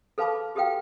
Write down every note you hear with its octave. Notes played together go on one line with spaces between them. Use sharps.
A4 B4 F5 A5 B5 D6
F#4 G4 A4 B4 F5 G5